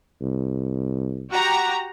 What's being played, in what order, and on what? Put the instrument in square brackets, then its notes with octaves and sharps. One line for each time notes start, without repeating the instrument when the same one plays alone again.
[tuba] C2
[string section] F#4 G4 A#5